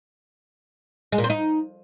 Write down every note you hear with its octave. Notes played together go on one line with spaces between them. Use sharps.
G#3
A#2
C4
D#4